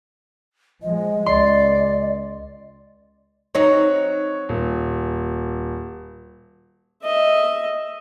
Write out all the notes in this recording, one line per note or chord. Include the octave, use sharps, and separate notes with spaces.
F3 G#3 D#5
C#2 D5 C6
F#3 C4 D#4 C#5
D#1
D#5 E5